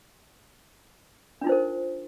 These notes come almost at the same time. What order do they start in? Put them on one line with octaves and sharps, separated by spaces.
D4 F4 D#4 C5 A#4